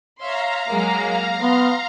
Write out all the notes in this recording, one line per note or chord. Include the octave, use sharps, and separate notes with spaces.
C#5 E5 F5 A#5 C6
F#3 G#3 A#3
B3 C6